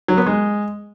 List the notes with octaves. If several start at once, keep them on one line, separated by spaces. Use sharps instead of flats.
F#3
B3
G#3